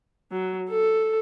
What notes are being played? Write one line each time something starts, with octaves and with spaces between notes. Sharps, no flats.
F#3
A4